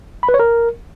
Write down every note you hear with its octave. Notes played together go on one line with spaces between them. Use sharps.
B5
B4
C#5
A#4